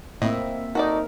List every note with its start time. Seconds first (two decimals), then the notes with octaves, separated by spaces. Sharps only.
0.22 A2 A#3 C4 E4 D#5 E5
0.75 D#4 F#4 A4 A#4 D5